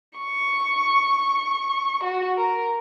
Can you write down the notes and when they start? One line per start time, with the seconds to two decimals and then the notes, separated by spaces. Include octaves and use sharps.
0.19 C#6
2.03 F#4
2.37 A#4